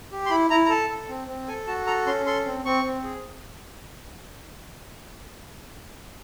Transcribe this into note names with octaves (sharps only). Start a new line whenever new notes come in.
G4
C6
E4 B5
E4 A#5
A#5
A4 A5
A4
C4
C4
A4 G#5
F#4 A5
A4 A#5
C#4 C6
A4 C6
C4
C4 C#6
C4
G#4